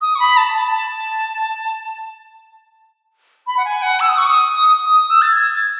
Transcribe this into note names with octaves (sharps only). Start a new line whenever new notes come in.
D#6
C#6
B5
A5
A5
A5
B5
F#5
G#5
F#5
E6
D#6
C#6
D#6
D#6
E6
A6
G#6
A6